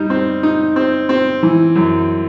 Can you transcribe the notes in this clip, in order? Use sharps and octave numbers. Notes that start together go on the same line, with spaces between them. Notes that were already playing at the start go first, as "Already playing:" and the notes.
Already playing: G3 D#4
C4
D#4
C4
C4
E3
F#2